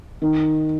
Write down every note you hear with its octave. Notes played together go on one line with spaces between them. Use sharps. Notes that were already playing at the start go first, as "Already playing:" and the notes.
D#3